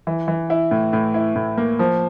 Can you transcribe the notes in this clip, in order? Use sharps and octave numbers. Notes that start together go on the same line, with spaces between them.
E3
E3
E4
A2
A2
E4
A2
A#3
F3